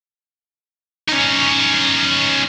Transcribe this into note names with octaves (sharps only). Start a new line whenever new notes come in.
C#4 D#4